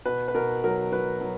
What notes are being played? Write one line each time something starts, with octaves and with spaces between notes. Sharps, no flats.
B2 B4
B4
B2 A#4
F#3 A#4
F#3 B4
F#3